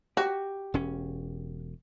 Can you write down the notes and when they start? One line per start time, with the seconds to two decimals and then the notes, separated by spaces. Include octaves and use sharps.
0.17 F#4 G4
0.74 E1 C#4